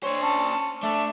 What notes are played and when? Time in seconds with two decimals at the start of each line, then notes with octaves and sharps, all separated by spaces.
0.04 D4 C5 C#5
0.22 C#4 A5
0.83 A3 D4 E5